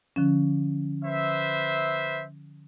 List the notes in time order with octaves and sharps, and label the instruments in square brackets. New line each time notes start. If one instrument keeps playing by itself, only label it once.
[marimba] D3 F3 C#4
[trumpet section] B4 C5 E5